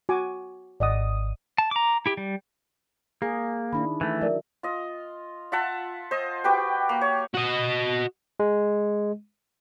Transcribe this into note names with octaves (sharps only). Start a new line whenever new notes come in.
F#4 G#5 D6
G#1 D5 D#5 F#5 D#6
A5
A#5 D6
E4 G4
G3
A#3 G#4
D#3 D4 E4 B5
E3 A3
F#3 A#4 D5 E5
F4 D#5
F4 E5 F#5 A5
C5 D#5
F#4 G4 B4 G5
A#3
C#5
F#4 D#5
G#3